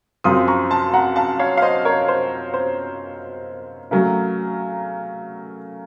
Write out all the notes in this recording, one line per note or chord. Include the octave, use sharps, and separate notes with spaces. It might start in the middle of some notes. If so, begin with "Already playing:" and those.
F#2 C#3 F3 C4 C6 D#6
A#5 C#6
A5 C6
F#5 A#5
F5 A5
C#5 F5
F5
C5 D#5
A#4 C#5
C5
C5
C#3 F#3 A3 A#4